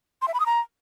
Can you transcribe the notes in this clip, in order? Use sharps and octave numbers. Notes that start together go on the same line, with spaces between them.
C6
E5
B5
D#6
A#5